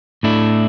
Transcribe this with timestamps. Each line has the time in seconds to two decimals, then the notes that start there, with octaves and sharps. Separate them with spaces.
0.23 A2 A3 D4 E4